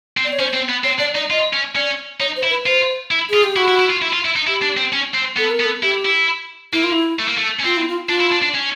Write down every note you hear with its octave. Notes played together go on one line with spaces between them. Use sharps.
C4
D5
C#5
C#4 C5
C4
B3
C4 C#5
D4 D5
D#4 D5
F4 D#5
C#4
C#4 D5
D#4 C#5
C5
E4
B4
F4 C5
E4
F4 G#4
G4
E4 F#4
E4
E4
F4
E4
F4
E4
D#4
E4 G4
D4
C4
C#4
C4
B3 A4
A#4
B3
A4
E4 G4
E4
A#3 E4
F4
E4
A3
A#3
A3
C#4
C4 F4
E4
F4
D4 F4
E4
D4
D4
C#4